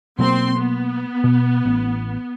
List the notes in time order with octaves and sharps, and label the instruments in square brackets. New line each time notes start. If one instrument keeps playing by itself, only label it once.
[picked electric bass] B2 F#3 A#3 [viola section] C4 C6
[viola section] B3
[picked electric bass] B2
A1